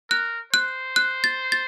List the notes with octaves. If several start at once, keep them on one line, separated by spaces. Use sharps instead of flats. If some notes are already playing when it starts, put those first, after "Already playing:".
A#4 F#6
C5 F#6
F#6
A6
A6